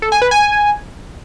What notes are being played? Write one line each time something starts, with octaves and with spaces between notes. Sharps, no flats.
A4
G#5
B4
G#5